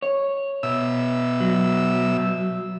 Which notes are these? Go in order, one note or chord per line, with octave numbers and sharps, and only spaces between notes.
C#5
B2 E5 E6
F#3